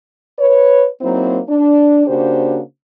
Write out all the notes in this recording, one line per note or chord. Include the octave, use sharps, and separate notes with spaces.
B4 C#5
F#3 A#3 C4 D#4 E4 C5
D4
C#3 A#3 D4 F#4 G4 C5